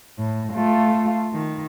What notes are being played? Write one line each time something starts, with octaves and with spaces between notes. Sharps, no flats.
A2
A3 F4
D#3